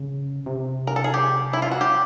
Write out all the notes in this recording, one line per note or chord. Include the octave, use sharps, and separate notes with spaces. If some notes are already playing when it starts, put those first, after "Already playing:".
Already playing: C#3
C3
A#4
A4
G#4
G4
E4
F4
F#4
G4